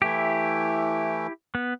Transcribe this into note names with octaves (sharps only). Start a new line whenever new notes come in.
E3 A3 E4 G4
B3